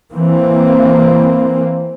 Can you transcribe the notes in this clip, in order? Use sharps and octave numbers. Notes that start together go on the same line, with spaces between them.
E3 A#3 C4